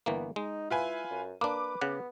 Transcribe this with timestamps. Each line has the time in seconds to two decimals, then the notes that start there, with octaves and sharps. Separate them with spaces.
0.06 G1 E3 A#3 B3
0.36 G#3 D#4
0.70 E4 F4 B4 G#5
1.11 F#2
1.41 A#3 D4 B4 D6
1.81 C#3 B3 F#5